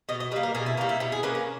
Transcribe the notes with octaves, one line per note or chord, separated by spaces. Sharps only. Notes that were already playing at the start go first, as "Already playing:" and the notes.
B2 D#5
D#5
G3 A#3 B4
A#4
B2 G#4
E4
G3 A#3 D#4
E4
B2 E4
G#4
A#3 C#4 B4
A#4